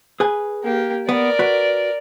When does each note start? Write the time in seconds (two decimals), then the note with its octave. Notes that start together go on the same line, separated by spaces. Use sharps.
0.20 G#4 B4 G#5
0.64 A#3 G4
1.09 B3 A#4 D5
1.39 F#4 B4